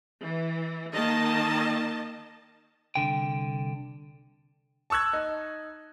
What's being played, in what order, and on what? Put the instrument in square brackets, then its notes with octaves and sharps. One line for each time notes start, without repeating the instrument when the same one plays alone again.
[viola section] E3
D#3 A#3 D#5 A5
[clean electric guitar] C2 B2 D3 G5
[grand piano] A5 C#6 E6 F#6 G#6
D#4